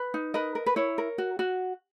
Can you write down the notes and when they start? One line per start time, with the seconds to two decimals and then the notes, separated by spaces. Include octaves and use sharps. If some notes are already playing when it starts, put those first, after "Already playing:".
Already playing: B4
0.14 D#4
0.34 A#4 B4 D#5
0.55 A#4
0.66 B4
0.76 E4 C#5
0.98 A#4
1.18 F#4
1.39 F#4